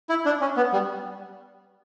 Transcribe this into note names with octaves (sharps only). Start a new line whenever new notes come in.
E4
D4
C#4
B3
G3